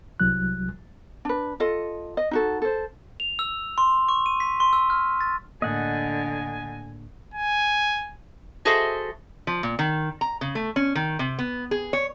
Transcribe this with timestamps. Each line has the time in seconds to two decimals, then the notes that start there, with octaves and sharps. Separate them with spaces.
0.20 C2 F#3 F#6
1.25 D4 B4
1.60 F4 A4 D#5
2.17 D#5
2.31 D#4 F#4 A4
2.62 A4 C5
3.20 F7
3.39 E6
3.78 C6
4.09 C#6
4.26 D#7
4.40 B6
4.60 C6
4.73 E6
4.90 F6
5.21 A6
5.62 A2 D3 A#3 D#5 F#5 G#5
7.34 G#5
8.65 F#4 G#4 A4 C5 D#5 E5
9.47 F3
9.63 A#2
9.79 D#3
10.21 A#5
10.41 C#3
10.55 A3
10.76 C#4
10.95 D#3
11.19 C3
11.39 B3
11.71 G#4
11.93 C#5